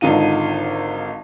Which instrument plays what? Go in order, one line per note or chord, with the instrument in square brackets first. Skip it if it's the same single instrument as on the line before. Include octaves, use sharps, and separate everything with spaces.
[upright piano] G#1 D3 D#4 F4 D#7